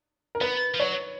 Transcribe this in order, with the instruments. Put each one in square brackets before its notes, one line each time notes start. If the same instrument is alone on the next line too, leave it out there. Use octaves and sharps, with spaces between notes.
[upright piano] A#4
[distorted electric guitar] B3 [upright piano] B4
[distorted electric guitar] F3
[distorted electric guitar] F#3 [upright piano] C#5